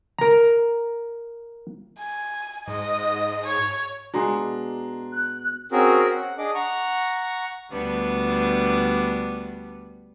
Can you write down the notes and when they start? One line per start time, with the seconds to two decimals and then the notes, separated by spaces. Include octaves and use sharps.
0.19 A#4 A#5
1.99 G#5
2.68 G#2 D#5
3.44 C#5
4.14 B2 G#3 D4 A#5 C6
5.13 F#6
5.72 C4 C#4 F#4 G#4 A#4
6.10 F#5
6.38 D4 G#4 D#5 D6
6.55 F#5 A#5 C#6
7.70 D2 G3 B3 D4